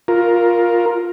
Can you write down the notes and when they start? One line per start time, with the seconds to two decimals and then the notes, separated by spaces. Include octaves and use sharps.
0.08 F4 A#4